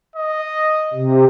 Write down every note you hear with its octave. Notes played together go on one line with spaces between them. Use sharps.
D#5
C3